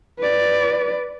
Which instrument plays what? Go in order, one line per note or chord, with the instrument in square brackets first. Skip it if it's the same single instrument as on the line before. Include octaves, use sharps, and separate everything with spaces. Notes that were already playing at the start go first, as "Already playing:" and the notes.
[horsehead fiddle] B4 D5